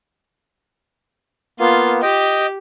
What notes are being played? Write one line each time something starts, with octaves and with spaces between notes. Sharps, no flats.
A#3 B3 F4
G4 D#5 G5